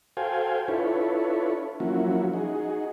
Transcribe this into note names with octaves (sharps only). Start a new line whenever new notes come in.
F#4 A4 C5 F5 G5 G#5
D4 E4 F4 A4 B4 C#5
F3 F#3 A#3 C#4 E4 F#4
D#4 F#4 G#4